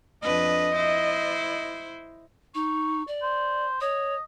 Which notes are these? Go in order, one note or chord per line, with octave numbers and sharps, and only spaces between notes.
F2 D4 B4 D#5
E4 C5
D#4 C#6
D5
C5
C#5 D#5